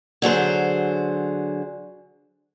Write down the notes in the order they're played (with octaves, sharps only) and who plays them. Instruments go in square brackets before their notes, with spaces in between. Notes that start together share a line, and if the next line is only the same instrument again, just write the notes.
[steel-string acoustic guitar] D3 F#3 G#4 C5